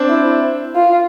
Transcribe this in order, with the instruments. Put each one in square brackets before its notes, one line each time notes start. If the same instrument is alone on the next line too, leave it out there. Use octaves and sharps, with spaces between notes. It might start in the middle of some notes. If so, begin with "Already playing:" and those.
Already playing: [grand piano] C4 D4
[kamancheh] E4
F4